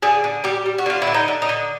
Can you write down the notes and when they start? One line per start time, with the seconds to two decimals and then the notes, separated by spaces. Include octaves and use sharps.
0.02 D3 G#4
0.24 D3
0.44 G3 G4
0.66 G3
0.78 F#4
0.86 D3 F4
1.02 E4
1.07 D3
1.14 D#4
1.28 D3
1.42 D#4
1.49 D3